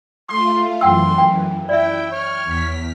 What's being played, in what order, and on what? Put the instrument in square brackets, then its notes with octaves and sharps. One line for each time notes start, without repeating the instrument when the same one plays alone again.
[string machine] A3 F4 [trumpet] C6 [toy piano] D6
[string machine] F#2 E3 [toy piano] F#5 G5 E6 [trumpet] C6
[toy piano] G5
[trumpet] E4 [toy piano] D5 E5 [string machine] G5
[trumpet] C#5 [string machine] F6
[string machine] E2 B6